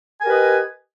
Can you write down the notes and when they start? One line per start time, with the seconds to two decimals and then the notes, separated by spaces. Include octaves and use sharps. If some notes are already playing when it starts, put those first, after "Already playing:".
0.20 G#5
0.23 A#4
0.26 G4
0.29 B4
0.31 D#5